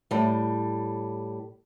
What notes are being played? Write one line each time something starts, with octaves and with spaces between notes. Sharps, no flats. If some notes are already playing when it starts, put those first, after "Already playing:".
A2 G3